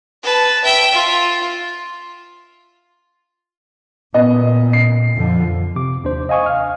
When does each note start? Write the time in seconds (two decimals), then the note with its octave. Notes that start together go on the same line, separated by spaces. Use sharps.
0.23 B4 A5
0.64 E5 G5
0.94 F4
4.14 A#2 B3 D#5
4.73 C7
5.15 F2 D3 F3
5.76 C3 D6
6.04 D#2 D4 C5
6.29 D#5 F5 G#5 C#6 D#6
6.46 F5 F6